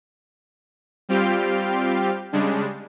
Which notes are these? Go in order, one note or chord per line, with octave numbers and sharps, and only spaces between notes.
G3 C4 F4 G4 F5 G5
C#3 G3 G#3 D4